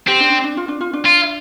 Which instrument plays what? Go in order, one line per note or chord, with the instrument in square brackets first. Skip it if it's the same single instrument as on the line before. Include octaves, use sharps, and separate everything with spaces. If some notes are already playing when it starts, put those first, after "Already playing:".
[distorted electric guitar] C4 [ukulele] G4
[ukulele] D4
D4
D4
F4
D4
F4
D4
[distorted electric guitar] F4